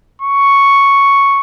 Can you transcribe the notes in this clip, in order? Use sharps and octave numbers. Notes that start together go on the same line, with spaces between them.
C#6